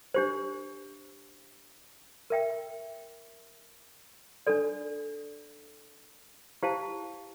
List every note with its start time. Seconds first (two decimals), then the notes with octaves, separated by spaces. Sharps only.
0.14 D4 G4 C5
2.30 A#4 E5 G5
4.47 D4 A4 D5
6.63 E4 G4 C5 F5 A5